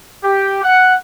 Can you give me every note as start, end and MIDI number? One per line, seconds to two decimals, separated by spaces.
0.24 0.62 67
0.64 0.94 78